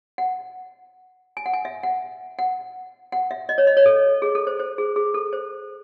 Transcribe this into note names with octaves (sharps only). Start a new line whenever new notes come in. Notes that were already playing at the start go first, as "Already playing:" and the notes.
F#5
G#5
F#5
G#5
E5
F#5
F#5
F#5
E5
D#5
C#5
D#5
C#5
A4
G#4
A4
C5
C5
G#4
G#4
A4
C5